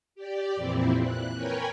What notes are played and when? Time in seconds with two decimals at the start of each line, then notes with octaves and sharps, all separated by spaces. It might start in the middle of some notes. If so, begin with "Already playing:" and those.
0.15 G4 D5
0.55 F2 A#2 E3 C4 E4
1.00 F#6
1.35 A#4 B4 C#5 G5 G#5